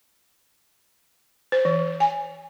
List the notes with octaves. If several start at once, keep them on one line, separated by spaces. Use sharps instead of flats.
C5
E3
G#5